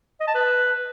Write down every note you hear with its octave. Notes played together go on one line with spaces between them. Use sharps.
D#5
A5
B4